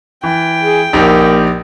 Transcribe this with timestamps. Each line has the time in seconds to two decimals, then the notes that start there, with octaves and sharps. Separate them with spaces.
0.24 E3 G5
0.62 G#4
0.93 A#1 A#3 D#4 G4